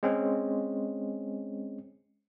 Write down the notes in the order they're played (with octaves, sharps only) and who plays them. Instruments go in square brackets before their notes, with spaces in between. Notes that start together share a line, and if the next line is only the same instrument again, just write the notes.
[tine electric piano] G#3 C4 C#4